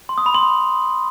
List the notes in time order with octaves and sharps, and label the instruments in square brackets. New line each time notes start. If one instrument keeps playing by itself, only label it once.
[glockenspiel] C6
D#6
B5
C6